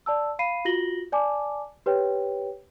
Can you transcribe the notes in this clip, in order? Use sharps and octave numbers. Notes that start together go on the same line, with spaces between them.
D5 A5 E6
F5 B5 C7 D#7
F4 F#4 A#6 F#7 G7
D5 G#5 A5 D6
G4 B4 C#5 G5